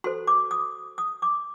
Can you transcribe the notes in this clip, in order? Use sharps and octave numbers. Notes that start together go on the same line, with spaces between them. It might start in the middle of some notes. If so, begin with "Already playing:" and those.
F#4 A4 C5 C6
D6
D#6
D#6
D6